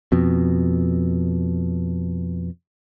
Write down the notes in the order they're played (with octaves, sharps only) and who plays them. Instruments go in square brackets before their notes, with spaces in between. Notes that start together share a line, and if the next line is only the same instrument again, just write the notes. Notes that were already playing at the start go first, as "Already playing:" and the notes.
[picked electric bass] F2 B2